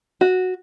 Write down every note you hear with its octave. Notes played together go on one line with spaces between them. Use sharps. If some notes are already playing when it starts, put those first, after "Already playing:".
F#4